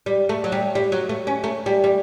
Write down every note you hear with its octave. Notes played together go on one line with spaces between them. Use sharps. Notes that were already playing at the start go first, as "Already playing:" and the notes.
G3
A3
F#3
G3
G3
F#3
A3
C#4
A3
G3
G3